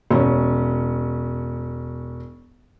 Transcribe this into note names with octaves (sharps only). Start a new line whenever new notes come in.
E1 C#4